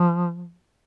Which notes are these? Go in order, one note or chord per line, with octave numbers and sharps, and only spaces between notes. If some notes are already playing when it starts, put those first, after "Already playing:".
Already playing: F3